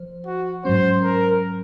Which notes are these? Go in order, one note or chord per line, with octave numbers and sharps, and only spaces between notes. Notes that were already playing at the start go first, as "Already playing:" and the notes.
Already playing: F3 C5
F#4
G#2 F#3 C#4 C5
A#4